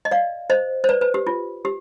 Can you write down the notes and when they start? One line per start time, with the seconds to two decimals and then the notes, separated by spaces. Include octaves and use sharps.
0.05 D#5
0.11 D5 F5
0.50 C5 D#5
0.84 C5
0.89 B4 D5
1.01 B4
1.14 G4
1.27 F4
1.65 G4